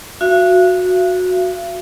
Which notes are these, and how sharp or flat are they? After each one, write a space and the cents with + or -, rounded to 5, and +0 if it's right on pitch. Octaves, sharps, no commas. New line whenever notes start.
F#4 -15 F5 -45